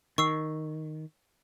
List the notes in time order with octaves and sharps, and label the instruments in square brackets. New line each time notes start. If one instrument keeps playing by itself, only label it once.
[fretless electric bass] D#3 [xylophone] C#6 E6 C7